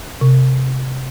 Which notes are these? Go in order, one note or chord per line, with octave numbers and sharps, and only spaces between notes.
C3